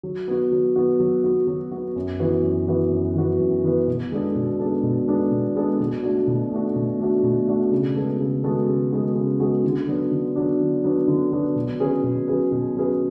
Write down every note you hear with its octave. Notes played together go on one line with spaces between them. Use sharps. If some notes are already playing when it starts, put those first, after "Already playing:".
F#3
B3 F#4
F#3
B3 F#4
F#3
B3 F#4
F#3
B3 F#4
F#2
E3 B3 F#4 B4
F#2
E3 B3 F#4 B4
F#2
E3 B3 F#4 B4
F#2
E3 B3 F#4 B4
B2
G#3 B3 D4 A4
B2
G#3 B3 D4 A4
B2
G#3 B3 D4 A4
B2
G#3 B3 D4 A4
B2
A3 D4 F#4
B2
A3 D4 F#4
B2
A3 D4 F#4
B2
A3 D4 F#4
C#3
G#3 B3 F#4 A4
C#3
G#3 B3 F#4 A4
C#3
G#3 B3 F#4 A4
C#3
G#3 B3 F#4 A4
D3
F#3 B3 D4
D3
F#3 B3 D4
D3
F#3 B3 D4
D3
F#3 B3 D4
B2
F#3 C#4 G#4 B4
B2
F#3 C#4 G#4 B4
B2
F#3 C#4 G#4 B4